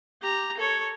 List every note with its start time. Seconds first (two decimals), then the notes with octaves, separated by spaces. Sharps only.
0.22 G4 A#5
0.57 A4 C#5